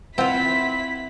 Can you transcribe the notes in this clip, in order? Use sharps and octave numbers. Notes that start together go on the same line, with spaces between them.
C4 E4 F4 E5 F#5 B5 B6